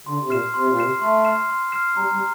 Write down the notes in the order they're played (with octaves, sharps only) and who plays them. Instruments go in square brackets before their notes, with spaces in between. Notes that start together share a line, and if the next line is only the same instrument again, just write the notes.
[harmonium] D3 [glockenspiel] C6
[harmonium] C3
[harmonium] A#2 [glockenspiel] F6 C7 E7
[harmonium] C3 [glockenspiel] C6
[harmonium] A#2
[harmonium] C3 [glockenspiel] F6 C7 E7
[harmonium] A3 [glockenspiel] C6
[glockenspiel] F6 C7 E7
C6
F6 C7 E7
[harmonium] G3 [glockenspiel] A#5
[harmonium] G3